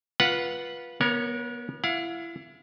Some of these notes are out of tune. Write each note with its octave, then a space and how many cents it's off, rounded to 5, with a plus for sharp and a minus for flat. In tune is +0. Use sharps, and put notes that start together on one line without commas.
F4 +0 B4 -15 F#5 +0
B3 -35 A#4 +5 C#5 +0
E4 +30 F5 +40